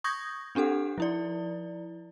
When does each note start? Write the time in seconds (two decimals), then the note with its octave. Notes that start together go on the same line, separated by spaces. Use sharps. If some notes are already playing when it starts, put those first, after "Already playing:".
0.04 C#6 D#6 G6 G#6 A#6
0.55 C4 D4 G4 A4 F#5
0.98 F3 E4 D5